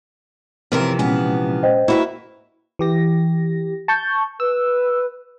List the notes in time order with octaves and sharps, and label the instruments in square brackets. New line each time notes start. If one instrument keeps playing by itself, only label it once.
[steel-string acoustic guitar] F#2 C4 A#4 [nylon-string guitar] C3 E3 F3
[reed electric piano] A#2 G#3 C#4 [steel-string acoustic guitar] B3 B4 [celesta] G#5
[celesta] C5 D#5 G5
[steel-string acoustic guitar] A#3 B4 E5 [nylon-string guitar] E4 F#4
[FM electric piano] E3 G4 A#6
A5 C#6 G6
[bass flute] B4 [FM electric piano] E6